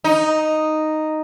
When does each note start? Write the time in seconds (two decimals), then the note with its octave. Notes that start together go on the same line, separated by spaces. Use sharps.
0.04 D#4